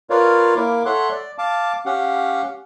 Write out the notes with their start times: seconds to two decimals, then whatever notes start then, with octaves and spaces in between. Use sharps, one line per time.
0.10 F4 A#4 B4 C#5 D5 F5
0.56 A#3 E4 A#4 D6
0.85 A4 C#5 E5 F#5 C6 F#6
1.10 D5
1.38 F5 A5 D6
1.86 C#4 G4 F5 F#5